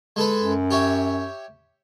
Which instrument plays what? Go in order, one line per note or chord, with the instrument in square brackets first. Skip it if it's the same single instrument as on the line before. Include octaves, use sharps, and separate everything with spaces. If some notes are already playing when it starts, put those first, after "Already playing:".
[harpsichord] G#3 A4 B4
[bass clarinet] F#2
[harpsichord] G4 C#5 E5